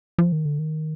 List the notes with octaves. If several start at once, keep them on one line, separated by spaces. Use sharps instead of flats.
F3
D#3
D3
D#3